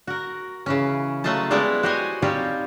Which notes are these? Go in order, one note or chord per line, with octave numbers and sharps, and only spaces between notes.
F#4 A#4
C#3 E3 C#4
F#3 A3 F4 D#5 A5
G3 G#3 B3 E4 C#5 D5
F#4 G4 C5 C#5 D#5 G#5
G3 C4 D#4 F4 G4 C#5